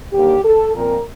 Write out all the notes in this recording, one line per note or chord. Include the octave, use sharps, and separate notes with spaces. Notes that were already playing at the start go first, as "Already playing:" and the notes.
D#2 D3 G3 A#3 G4
A4
A#2 F3 C4 A#4